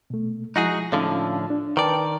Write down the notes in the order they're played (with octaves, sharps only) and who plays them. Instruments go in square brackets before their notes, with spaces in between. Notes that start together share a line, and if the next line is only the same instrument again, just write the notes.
[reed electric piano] B2 A3
[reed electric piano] F3 G#3 E4 [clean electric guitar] D#4 F#4 G#4
[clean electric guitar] A2 D3 F3 [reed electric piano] C#4 D#4 F5
[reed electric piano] D4
[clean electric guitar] D#3 D5 [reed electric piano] B4 G5 A5